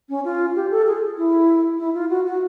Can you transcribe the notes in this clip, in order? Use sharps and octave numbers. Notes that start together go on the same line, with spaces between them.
C#4
F4
G4
A4
G#4
E4
E4
F4
F#4
F#4